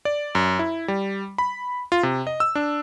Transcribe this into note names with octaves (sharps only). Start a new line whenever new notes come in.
D5
F#2
E4
G3
B5
F4
C3
D#5
E6
D4